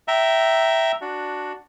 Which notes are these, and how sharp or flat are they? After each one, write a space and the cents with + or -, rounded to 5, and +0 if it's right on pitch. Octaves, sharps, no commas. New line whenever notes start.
E5 +0 G5 -20 A#5 +0
D4 +0 F#4 +0